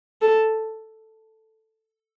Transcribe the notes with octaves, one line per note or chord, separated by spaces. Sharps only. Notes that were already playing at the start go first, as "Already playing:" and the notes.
A4